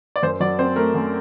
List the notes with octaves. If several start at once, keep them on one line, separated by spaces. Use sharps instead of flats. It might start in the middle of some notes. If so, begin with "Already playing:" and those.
D5
F#2 C5
F#3 D5
C4 C5
A3 A#4
F#2